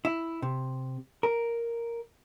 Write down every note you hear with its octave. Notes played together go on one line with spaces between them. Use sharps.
E4
C3
A#4